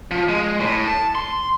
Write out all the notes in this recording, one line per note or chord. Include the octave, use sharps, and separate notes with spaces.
F3
G#3
A2
A5
C6